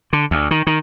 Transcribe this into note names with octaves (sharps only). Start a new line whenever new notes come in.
D3
D2
D#3
D#3